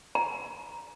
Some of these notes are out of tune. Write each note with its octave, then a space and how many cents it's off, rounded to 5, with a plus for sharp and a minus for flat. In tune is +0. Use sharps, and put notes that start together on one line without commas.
A#5 +10